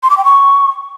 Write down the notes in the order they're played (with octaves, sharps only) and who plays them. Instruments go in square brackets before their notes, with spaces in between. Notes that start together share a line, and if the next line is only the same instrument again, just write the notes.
[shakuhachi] C6
D6
G5
C#6